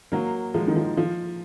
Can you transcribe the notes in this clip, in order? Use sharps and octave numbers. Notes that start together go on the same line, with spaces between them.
F#3 A#3
F3 G#3
D#3
F3
F3